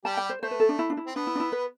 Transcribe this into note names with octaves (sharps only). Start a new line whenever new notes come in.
G3 G4 A5
G5
C5
A3 C5
B4
A4
D4
E4
D4
E4
C4
B3 D4
E4
D4
E4
B4